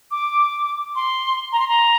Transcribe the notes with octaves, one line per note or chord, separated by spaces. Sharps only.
D6
C6
A#5
C6
A#5